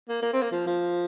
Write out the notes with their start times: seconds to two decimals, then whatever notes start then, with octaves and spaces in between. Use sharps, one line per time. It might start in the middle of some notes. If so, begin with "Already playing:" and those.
0.09 A#3
0.22 A#3
0.33 C4
0.42 A#3
0.52 F3
0.67 F3